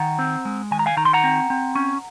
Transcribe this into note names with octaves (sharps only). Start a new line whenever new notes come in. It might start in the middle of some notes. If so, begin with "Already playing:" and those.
Already playing: D#3 F#5 A#5
C4
G#3
D#3 G#5
A#5
F5 G#5
D#3 A#5
C6
F#5 A#5
C4
C4
C#4